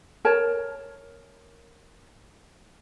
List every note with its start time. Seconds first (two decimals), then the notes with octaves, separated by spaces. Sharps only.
0.25 A#4 C#5 A5